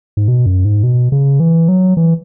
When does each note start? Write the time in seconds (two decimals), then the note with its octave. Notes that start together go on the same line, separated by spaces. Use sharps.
0.17 G#2
0.28 B2
0.46 F#2
0.65 G#2
0.83 B2
1.12 C#3
1.40 E3
1.68 F#3
1.97 E3